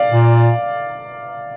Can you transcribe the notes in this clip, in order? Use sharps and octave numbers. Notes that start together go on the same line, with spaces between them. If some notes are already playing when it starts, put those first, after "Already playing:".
Already playing: D5 F5
A#2